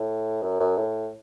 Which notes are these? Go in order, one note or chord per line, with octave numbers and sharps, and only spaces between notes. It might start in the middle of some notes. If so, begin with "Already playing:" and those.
Already playing: A2
F#2
F#2
A2